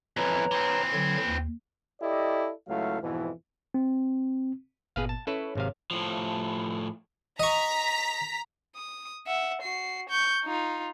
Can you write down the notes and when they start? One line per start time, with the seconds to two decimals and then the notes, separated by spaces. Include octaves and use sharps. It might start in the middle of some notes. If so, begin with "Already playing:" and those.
0.17 F2 E3 B4 C#5 A#5
0.51 E3 C4
0.93 D3 F#3 G#6
1.26 D#2
2.02 E4 G4 A4 D5 D#5
2.69 C#2 F#3 A3 E4 F5
3.01 F2 G#2 B2 E3
3.74 C4
4.96 G1 A#2 B3 G#4 B4 F5
5.09 A5
5.27 C#4 E4 A4 B4 C#5
5.55 G#1 C3 F5
5.91 A2 F3
7.40 D#5 A#5 C#6 B6
8.75 D#6
9.27 E5 F#5
9.62 F#4 C7
10.09 C#6 G6
10.44 D#4 F4